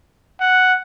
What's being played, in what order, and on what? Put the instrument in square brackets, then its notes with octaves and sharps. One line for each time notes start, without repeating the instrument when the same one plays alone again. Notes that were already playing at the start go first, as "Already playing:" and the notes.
[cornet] F#5